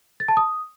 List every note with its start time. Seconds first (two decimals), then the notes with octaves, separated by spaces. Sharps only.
0.20 A6
0.28 A5
0.37 D#6